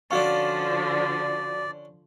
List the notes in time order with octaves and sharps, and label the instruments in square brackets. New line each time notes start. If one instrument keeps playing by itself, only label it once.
[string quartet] D3 F3 [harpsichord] C#4 D4 [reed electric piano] F#4 F5 C#6 [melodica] D5